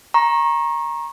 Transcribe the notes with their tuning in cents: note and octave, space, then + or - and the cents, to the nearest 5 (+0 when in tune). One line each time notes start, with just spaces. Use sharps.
A#5 +15 C#6 -30